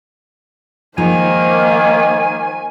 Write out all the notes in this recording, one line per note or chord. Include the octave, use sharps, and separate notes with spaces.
D#3 F3 G#3 A#3 D#4 C5 G#5